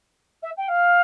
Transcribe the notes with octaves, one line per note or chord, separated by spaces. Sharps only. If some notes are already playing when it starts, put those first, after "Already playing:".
E5
G5
F5